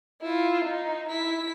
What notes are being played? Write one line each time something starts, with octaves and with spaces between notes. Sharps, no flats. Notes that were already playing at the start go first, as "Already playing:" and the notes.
E4 F4
D#4
E4 B6